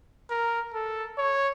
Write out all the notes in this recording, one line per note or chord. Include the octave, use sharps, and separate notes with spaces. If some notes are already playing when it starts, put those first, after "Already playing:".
A#4
A4
C#5